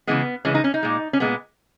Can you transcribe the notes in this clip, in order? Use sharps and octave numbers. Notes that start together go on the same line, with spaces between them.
C#3 E3 G#3 B3
C#3 E3 G#3 C#4
D#4
C#4
D#4
A#2 G#3
C#4
A#2 G#3 B3